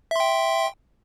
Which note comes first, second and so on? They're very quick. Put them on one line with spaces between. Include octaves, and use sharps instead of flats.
E5 C6 G5